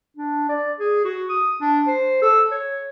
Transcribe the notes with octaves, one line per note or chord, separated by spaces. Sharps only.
D4
D5
G#4
F#4
D#6
D4
C5
A4
C#5